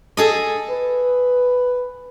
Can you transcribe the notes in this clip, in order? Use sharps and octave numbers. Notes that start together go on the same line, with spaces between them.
G#4 A4 D#5
B4